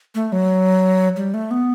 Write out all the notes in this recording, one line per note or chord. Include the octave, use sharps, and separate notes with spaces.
A3
F#3
G3
A3
B3